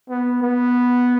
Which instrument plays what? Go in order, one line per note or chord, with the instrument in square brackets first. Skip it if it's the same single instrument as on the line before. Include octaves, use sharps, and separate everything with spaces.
[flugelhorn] B3
B3